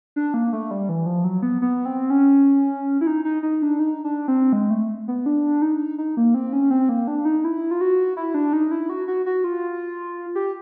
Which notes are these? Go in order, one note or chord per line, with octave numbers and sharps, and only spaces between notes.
D4
A#3
A3
G3
E3
F3
F#3
B3
B3
C4
C#4
E4
D#4
D#4
D#4
D4
D#4
D4
C4
G#3
A3
B3
D4
D#4
D#4
A#3
C4
C#4
C4
A#3
D4
D#4
E4
F4
F#4
E4
D4
D#4
E4
F#4
F#4
F#4
F4
G4